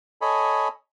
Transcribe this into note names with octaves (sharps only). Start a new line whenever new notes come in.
A4 C#5 D#5 G#5 B5